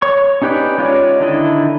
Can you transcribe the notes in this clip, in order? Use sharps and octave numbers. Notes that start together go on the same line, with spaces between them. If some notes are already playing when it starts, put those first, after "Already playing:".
C#5 C#6
C#4 D#4 G4 B4 D5
G#3 C#4 F4 C#5 D5
D3 D#3 D4 E4 D#5